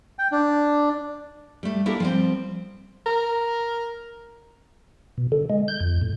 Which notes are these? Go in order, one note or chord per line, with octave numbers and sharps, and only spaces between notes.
G5
D4
G3 A3
A#3 D4 E4 G4 A4
F3 G3 C4
A#4
B2
D3
G#3
G6
F2
A2